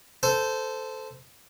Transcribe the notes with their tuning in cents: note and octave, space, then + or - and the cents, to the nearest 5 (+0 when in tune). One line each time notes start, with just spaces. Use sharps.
A4 +0 C5 -15